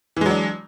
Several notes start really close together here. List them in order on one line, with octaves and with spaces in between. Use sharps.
E3 G#3 F#3 D4